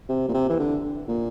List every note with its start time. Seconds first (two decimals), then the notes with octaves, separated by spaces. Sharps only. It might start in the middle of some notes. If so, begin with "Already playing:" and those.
0.09 C3
0.28 A#2
0.34 C3
0.49 E3
0.59 D3
1.08 A#2